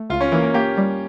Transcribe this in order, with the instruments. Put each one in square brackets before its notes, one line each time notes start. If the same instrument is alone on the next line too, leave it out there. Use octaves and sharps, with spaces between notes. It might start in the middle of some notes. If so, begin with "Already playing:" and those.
Already playing: [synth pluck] A3
[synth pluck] C#2 [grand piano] F4
[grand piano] C#4
[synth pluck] E3 [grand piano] A#3
[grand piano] A#3
[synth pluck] A#3 [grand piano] G4
[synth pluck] G3